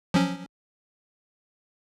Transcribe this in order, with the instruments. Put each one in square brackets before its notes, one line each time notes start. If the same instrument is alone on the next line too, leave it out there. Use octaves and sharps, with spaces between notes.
[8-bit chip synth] F3 F#3 C#4